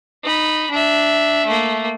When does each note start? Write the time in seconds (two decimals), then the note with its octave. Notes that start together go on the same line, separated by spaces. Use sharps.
0.24 D#4 B5
0.71 D4 E5
1.46 A3 A#3